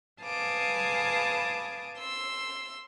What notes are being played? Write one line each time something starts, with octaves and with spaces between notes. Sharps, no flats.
B4 F5 G#5 A5 D6 D#6
C6 E6